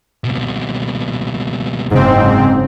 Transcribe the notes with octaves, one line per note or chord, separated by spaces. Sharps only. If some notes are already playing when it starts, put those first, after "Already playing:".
C#2 B2
F#1 G#2 C#3 C4